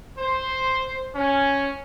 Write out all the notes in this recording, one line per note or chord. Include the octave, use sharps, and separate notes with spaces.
C5
C#4